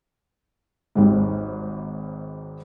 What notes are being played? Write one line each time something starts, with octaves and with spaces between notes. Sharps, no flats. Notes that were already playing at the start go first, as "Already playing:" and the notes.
G#1 D#2 G#2